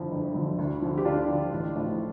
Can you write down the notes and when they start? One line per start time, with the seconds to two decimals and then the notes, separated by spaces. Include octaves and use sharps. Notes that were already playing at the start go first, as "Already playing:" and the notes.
Already playing: G1 F2 D3 F3 E4
0.11 G1
0.34 F2 D3 F3
0.58 D2
0.82 D3 F3
0.98 G4
1.05 D2 D4 F4
1.28 D3 F3
1.52 A1
1.76 A2 F3